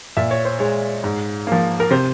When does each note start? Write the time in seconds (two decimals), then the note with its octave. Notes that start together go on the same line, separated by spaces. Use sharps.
0.17 A#2 E5
0.31 C#5
0.45 C5
0.59 G#3 C#5
1.04 G#2
1.47 F3 A#3
1.80 A#4
1.91 C3 C5